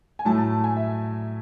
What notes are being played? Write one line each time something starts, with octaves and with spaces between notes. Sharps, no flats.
G#5
A2 F#3 A3 A5
A5
G#5
E5